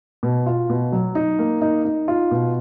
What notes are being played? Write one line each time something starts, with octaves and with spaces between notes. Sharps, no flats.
B2
F4
B2
F#3
D#4
A#3
D#4
D#4
F4
B2